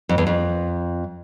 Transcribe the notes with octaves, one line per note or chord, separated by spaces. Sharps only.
F2
E2
F2